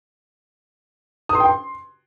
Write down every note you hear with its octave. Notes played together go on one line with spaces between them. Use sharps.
D#6
C6
G5
C6